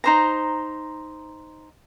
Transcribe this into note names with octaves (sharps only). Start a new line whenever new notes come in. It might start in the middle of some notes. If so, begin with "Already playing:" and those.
D#4 C5 A#5